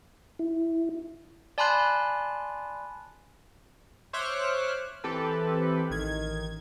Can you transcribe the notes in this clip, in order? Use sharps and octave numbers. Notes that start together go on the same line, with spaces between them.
E4
D5 G#5 A5 B5 C6 F#6
C5 C#5 E5 D6 F6 F#6
E3 C4 G4 A4 B4
A1 D#3 G#6